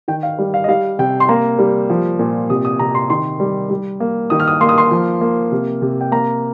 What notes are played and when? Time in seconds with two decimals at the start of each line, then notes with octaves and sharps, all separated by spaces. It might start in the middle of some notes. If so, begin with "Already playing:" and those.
0.08 D#3 G5
0.23 F5
0.39 G3
0.54 F5
0.64 D#5
0.68 G3 F5
0.99 C3 G5
1.20 C6
1.29 A#3 A#5
1.59 G3
1.90 F3
2.19 A#2
2.50 C3 D#6
2.65 D#6
2.79 C3 A#5
2.95 C6
3.10 D#3 C6
3.40 G3
3.70 G3
4.00 A#3
4.30 D#3 D#6
4.40 F6
4.48 D#6
4.61 A#3 C6
4.69 D#6
4.78 C6
4.91 F3
5.21 A#3
5.52 C3
5.82 C3
6.01 G5
6.12 A#3 A#5